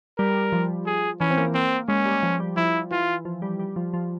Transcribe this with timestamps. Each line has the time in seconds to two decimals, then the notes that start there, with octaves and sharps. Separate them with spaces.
0.18 G3 A#4
0.52 F3
0.86 G#4
1.20 E3 C#4
1.31 C4
1.38 A#3
1.54 A#3 C4
1.88 G#3 C#4
2.05 G3
2.23 F3
2.40 G3
2.57 F3 E4
2.91 E3 F4
3.25 F3
3.42 G3
3.59 G3
3.76 F3
3.93 F3